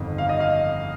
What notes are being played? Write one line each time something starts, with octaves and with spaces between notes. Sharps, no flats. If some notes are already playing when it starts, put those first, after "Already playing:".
Already playing: G1 F2 D#3
F5
D#5
F5